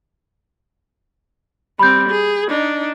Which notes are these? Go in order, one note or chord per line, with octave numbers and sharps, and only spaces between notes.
G3 C4 B5 G6
G#4
D4 D#4